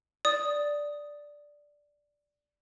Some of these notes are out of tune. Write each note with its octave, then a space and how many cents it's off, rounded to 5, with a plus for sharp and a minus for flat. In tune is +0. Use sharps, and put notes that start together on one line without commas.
D5 +0 D#6 +0